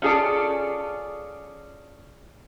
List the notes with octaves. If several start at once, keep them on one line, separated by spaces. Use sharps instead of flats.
C#4 F4 G#4 A4 D5